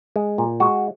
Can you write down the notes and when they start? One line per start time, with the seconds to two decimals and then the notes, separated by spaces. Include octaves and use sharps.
0.16 G#3
0.38 A#2
0.60 G#3 F#4